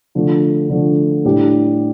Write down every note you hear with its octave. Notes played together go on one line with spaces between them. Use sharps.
D3 F3 A3
D3 F3 A3
A2 G3 D4 G4